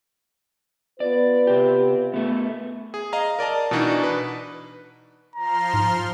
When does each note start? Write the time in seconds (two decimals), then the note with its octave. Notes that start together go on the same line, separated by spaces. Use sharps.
1.00 B3 F4 B4 D5
1.47 C3 G4
2.14 A3 B3
2.94 G#4
3.13 D#5 F5 A#5
3.39 A#4 D5 D#5 A5
3.71 B2 E3 B3 D4 D#4 F#4
4.03 B4
5.36 F3 A#5 C6 F6
5.74 G#2